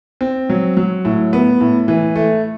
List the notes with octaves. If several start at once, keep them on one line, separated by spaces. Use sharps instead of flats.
C4
F#3
F#3
A2
B3
A2
E3
A3